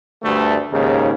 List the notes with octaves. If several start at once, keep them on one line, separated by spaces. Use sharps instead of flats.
D2 G2 A3
D#2 G#2 C#3